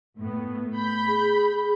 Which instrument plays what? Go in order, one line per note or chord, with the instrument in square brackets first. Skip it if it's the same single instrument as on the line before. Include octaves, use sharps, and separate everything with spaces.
[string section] A2 B3
B5 G6
[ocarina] G#4